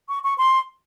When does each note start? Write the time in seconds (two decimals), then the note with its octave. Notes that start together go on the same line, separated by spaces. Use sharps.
0.09 C#6
0.24 C#6
0.38 C6